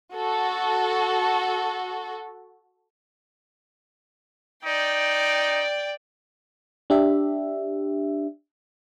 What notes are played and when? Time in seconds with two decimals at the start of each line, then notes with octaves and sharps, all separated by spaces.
0.15 F#4 A4
4.65 D#4 D5 G5
6.90 D4 G4 E5